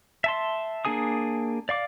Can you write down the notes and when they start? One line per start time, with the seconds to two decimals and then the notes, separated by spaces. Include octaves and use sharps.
0.24 E5 A5 C6
0.85 A#3 D4 G#4 G#5 D#6
1.69 D5 F5 D6